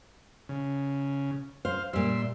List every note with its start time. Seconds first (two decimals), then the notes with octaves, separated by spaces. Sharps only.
0.49 C#3
1.65 C5 F5
1.93 A#2 G3 E5 C6